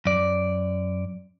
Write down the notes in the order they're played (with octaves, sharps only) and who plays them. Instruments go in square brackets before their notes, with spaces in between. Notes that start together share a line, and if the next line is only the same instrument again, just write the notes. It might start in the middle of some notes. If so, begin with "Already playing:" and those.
[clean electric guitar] F#2 D5